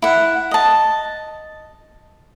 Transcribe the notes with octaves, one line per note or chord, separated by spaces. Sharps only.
E4 F#5
D#5 A5